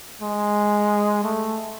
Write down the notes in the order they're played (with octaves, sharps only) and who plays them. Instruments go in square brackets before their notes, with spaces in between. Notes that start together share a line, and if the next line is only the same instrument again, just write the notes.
[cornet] G#3
A3